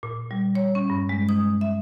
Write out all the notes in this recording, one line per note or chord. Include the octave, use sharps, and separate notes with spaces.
A#2
G3
C#5
C#4
G2
G#3
D#6
E5